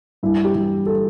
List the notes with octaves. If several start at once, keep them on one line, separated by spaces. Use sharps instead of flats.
G2 E4
G4
E3
A4